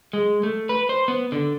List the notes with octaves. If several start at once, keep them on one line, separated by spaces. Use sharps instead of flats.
G#3
A3
B4
C5
B3
D3